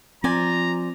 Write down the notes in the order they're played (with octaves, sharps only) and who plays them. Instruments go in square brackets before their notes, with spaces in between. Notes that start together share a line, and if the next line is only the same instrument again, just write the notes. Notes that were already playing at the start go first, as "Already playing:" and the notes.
[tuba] F3 [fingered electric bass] C4 [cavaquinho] C5 D5 G#5 [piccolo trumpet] A#5